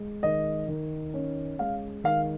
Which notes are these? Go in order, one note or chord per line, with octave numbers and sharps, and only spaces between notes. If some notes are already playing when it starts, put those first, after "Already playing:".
Already playing: G#3
D#3 D#5
D#3
C#4
G#3 F5
D#3 F5